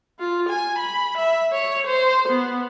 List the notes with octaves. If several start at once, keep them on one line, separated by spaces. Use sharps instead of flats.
F4
G#5
B5
E5
C#5
C5
B3